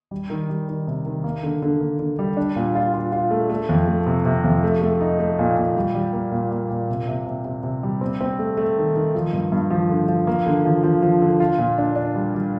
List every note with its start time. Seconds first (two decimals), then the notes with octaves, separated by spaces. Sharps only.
0.11 G3
0.30 D#3
0.49 G3
0.68 D#3
0.87 C3
1.05 D#3
1.24 A#3
1.43 D3
1.62 D3
1.80 A#3
1.99 D3
2.19 G3
2.37 D4
2.56 A#2
2.75 F4
2.94 F4
3.12 F4
3.31 A3
3.50 A3
3.69 F2
3.88 A3
4.07 C3
4.25 C3
4.44 F2
4.63 A3
4.82 A3
5.00 D#4
5.19 A3
5.39 A#2
5.57 A#2
5.76 G3
5.95 G3
6.13 A#3
6.32 A#2
6.51 A#3
6.70 A#2
6.88 C3
7.08 C3
7.27 C3
7.45 C3
7.63 C3
7.83 G3
8.01 C4
8.21 C4
8.39 A3
8.57 A3
8.77 D#3
8.95 D#3
9.15 F3
9.33 G2
9.52 G2
9.70 F3
9.89 D3
10.08 F3
10.27 A#3
10.46 D3
10.65 F3
10.83 F3
11.02 F3
11.22 D3
11.40 F4
11.58 A#2
11.78 D4
11.96 D4
12.15 G3
12.34 G3